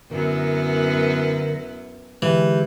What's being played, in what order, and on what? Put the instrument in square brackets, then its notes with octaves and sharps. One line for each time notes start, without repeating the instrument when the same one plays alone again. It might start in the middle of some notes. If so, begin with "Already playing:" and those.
[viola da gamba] F#2 B3 E4 [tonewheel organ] D3 A#4
[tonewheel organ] D3 G#3 G4 [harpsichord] E3